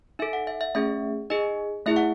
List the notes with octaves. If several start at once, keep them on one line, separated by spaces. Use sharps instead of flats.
D#4 A4 E5
F#5
E5
E5
A3 C#4 G#4 E5
D#4 G#4 D#5
A3 E4 G#4 E5
F#5